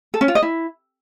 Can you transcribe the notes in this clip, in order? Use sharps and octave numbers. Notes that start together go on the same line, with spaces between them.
A4
C#4
F4
D#5
E4